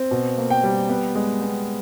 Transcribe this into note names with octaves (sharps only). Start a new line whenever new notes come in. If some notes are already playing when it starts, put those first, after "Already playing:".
Already playing: C4
B2
A#3
G5
G3
B3
G#3
B3